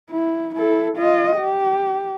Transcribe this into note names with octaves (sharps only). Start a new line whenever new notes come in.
E4
E4 A4
F4 D#5
G4